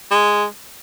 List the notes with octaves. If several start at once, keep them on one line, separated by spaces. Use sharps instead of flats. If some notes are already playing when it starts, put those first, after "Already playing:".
G#3